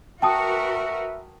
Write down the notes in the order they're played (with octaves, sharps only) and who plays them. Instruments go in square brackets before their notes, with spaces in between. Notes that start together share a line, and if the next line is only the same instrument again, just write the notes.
[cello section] F#4 A#4 B4 [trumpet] E5 [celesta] G5 A5 D#6